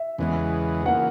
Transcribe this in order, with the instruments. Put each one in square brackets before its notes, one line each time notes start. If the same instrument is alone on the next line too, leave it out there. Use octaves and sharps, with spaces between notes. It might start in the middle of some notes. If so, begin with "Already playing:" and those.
Already playing: [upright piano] E5
[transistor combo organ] E2 C#3 E3 G#3 B3
[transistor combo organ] C#3 E3 A#3 [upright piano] F#5